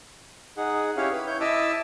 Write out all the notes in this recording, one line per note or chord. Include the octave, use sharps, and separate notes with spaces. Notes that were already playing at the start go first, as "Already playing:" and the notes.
D#4 G#4 F#5
C#4 E4 G4 C#5 F5
B4
E4 C#5 G6
E4 D#5 E5 A5 D6 E6